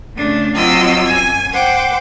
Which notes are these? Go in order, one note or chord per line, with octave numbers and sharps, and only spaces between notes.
C#3 A3 D4
F#3 C4 F4 D#5 D6 E6
F#2 G#5
C5 F#5 G5 D6